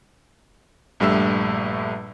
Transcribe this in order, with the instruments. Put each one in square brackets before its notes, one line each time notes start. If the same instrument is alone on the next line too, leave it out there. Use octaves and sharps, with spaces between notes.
[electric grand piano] A#1 G2 G3 A3 E5 E6